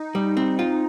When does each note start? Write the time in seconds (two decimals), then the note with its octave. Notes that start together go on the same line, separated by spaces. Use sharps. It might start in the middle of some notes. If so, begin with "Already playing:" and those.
Already playing: D#4
0.15 G3
0.37 C4
0.59 F4